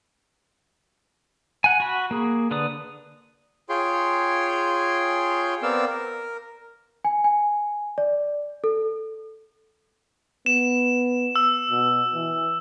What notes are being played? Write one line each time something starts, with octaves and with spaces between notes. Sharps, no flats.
F#5 G#5
F#4 B5
A#3 G#4
D3 B4 D5 D#6
F4 G#4 C#5 G5 C6
B3 C4 A#4 D5 F5 E6
A#4
G#5
G#5
D5
A4
B3 E7
E6
B2
E3